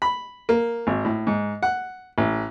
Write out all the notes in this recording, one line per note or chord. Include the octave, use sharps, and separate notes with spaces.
B5
A#3
G#1
A2
G#2
F#5
A1